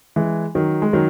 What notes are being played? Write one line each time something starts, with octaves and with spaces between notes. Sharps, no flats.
E3 G#3
D#3 F#3
G#3
D#3 F#3